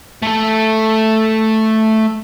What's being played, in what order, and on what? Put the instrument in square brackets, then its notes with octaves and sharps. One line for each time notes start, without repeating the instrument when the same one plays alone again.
[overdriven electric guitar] A3 A4